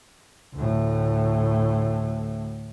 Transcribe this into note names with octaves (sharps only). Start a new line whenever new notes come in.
D2 A2